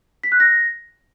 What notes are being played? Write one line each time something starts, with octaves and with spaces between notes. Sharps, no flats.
B6
F#6
A#6